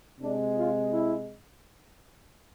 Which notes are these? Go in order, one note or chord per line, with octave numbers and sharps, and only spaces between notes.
C3 G#3 D4
F4
E4